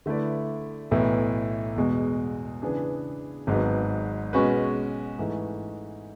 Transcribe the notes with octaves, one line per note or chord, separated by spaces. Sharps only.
D3 A3 E4 B4 D5
B1 A2 E3 B3 E4
E2 B2 G#3
C#3 E3 B3 D4 G#4
G#1 G#2 F#3 B3
B2 G#3 C#4 F#4 B4
G#2 E3 A3